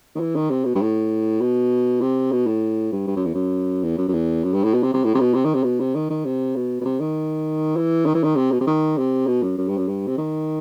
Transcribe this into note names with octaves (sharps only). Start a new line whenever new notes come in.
D#3
E3
D#3
C3
B2
G2
A2
B2
C3
B2
A2
G2
G2
F#2
E2
F#2
E2
F#2
F#2
E2
F#2
G2
A2
B2
C3
C3
A2
C3
B2
C3
D#3
C3
B2
C3
D#3
D#3
C3
B2
B2
C3
D#3
E3
D#3
E3
D#3
C3
B2
C3
D#3
C3
B2
F#2
F#2
G2
F#2
G2
C3
D#3